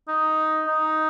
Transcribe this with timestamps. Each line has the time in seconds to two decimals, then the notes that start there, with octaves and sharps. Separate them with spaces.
0.08 D#4
0.67 D#4